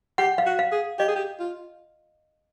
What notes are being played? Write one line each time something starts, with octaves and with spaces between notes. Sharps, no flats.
G4 F#5
F5
F#4
F5
G#4
G4 D#5
G#4
G4
F4